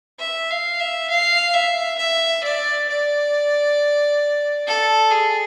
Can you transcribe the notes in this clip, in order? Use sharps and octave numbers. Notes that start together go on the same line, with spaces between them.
E5
F5
E5
F5
E5
E5
D5
D5
A4
G#4